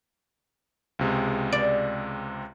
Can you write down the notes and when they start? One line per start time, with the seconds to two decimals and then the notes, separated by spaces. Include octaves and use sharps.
0.99 C#2 C3 G#3
1.52 D5